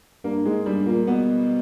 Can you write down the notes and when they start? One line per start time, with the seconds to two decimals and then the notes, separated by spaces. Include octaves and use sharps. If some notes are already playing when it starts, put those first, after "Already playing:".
0.24 G2 A#3
0.45 G#2 G#3
0.65 G2 G3
0.86 A#2 A#3
1.07 B2 B3